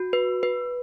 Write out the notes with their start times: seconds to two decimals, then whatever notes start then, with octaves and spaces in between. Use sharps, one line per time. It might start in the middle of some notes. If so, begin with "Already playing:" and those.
Already playing: F#4
0.13 B4
0.43 B4